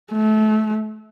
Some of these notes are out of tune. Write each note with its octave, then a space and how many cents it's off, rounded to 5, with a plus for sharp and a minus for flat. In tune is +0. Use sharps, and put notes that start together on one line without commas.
A3 -25